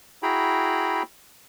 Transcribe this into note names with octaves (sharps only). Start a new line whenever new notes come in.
E4 F#4 G#4 G5 A#5 B5